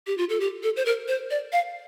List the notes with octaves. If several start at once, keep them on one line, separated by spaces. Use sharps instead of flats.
G4
F4
A4
G4
A4
C5
A#4
C5
D5
F5